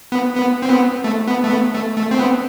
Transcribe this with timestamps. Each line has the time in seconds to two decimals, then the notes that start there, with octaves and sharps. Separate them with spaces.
0.12 B3
0.35 B3
0.62 C4
0.70 B3
1.04 A3
1.28 B3
1.44 A3
1.50 B3
1.73 A3
1.96 A3
2.11 C4
2.19 B3